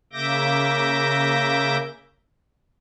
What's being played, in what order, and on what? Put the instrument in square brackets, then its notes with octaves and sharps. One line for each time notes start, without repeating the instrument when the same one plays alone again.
[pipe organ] C#3 A#3 E5 D6 G6 A#6